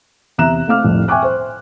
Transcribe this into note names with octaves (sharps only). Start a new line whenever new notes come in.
E2 C3 E5 A#5 F#6 E7
A3 C4 F5 D6 F6
C2 F2 A2
E5 G5 G#5 C#6 D6 F#6
C5